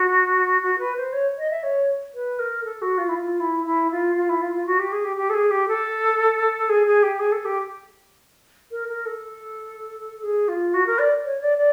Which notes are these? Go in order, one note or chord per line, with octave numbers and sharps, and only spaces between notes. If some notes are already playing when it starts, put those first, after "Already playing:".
Already playing: F#4
F#4
B4
C5
C#5
D#5
E5
C#5
B4
A#4
A4
F#4
F4
E4
F4
E4
E4
F4
F4
E4
F4
F4
F#4
G4
G#4
G4
G4
A4
G#4
G4
A4
G#4
G#4
G4
G#4
A4
G4
A#4
A#4
A4
G#4
F4
F#4
A#4
D5
C#5
D5
D5